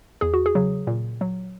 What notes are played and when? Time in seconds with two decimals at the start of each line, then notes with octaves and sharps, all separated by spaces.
0.21 E2 G#4
0.34 F#4
0.46 G#4
0.55 C#3 F#3
0.87 A#2
1.21 F#3